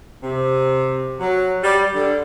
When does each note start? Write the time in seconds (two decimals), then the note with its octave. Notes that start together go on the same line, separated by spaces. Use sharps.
0.23 C3
1.20 F#3
1.62 G3
1.94 D3